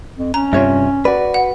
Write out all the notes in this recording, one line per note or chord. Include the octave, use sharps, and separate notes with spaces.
F2
C#4 A#5
G2 C3 F4 C#5 E5
F#4 B4 D5
F#5